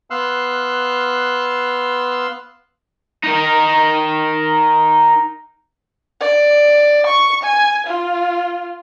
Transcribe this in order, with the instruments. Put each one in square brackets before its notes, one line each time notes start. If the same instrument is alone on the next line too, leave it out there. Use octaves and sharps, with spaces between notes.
[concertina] B3 F5 C6 E6 F#6
[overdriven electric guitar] D#4 A#4
[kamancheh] D5
C#6
G#5
F4